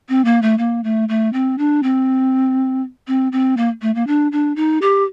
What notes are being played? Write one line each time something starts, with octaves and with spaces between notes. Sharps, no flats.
C4
A#3
A3
A#3
A3
A3
C4
D4
C4
C4
C4
A#3
A3
A#3
D4
D4
D#4
G4